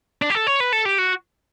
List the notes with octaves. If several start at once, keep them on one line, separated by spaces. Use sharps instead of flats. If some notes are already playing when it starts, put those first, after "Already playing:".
D4
G4
A4
C#5
B4
A4
G4
F#4